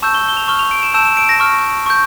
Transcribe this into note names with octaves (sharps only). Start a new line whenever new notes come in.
A5 C#6 E6 G6 E7
G7
G7
F7
C#6 F6 G7
F7
D7
E7
A5 E6 G6 E7
E7
D7
A#6
C#6 F6
C#6 G6